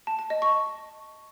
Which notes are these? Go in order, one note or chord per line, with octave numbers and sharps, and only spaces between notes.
A5
A5
D#5
C#6